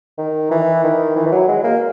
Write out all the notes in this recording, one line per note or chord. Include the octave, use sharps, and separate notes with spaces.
D#3
E3
D#3
E3
E3
F#3
G#3
A#3